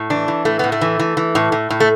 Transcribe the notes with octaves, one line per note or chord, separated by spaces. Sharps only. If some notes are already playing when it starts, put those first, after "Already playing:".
Already playing: A2
E3 D4
E3
A2 A3
A2 B3
A3
E3
E3
E3
A2
A2
A2
A3